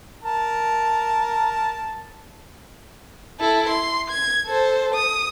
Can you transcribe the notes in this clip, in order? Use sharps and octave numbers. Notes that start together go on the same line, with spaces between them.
A#4 A5
E4 A4
C6
G#6
A4 C5
D#6